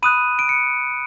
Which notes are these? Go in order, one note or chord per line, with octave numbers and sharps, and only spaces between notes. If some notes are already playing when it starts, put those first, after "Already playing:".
B5 D#6 F#6 D#7
D7
C#7